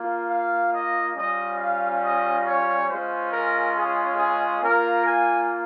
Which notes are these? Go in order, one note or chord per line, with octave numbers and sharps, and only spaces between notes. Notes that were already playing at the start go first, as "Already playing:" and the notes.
Already playing: A#3 F4
F5
D#5
G3 C#4 F4 D#5
F5
D#5
C#5
G#3 C#4 F4 C5
A#4
G#4
G#4
A#3 F4 A#4
G#5